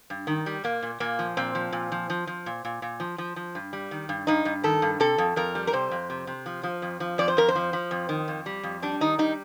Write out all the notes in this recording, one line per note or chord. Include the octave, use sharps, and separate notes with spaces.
G2
D#3
G3
A#2 A#3
A#2
A#2 A#3
F3
A#2 C4
F3
A#2
F3
F3
F3
A#2
A#2
A#2
F3
F3
F3
G2
G3
D#3
G2
G2 D#4
G2
D#3 A4
G2
C3 A4
F2
F2 A#4
G3
A#4
C3 C5
F2
C3
C3
F3
F3
F2
F3
F2 D5
C5
F2 A#4
C5
F3
F3
F2
D#3
F2
G3
F2
G3 D4
D#3 D#4
G3 D#4